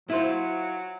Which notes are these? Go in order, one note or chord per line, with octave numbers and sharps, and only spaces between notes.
F#3 E4 F4 C5